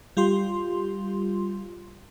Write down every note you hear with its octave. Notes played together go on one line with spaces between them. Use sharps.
G3 F4 G4 C6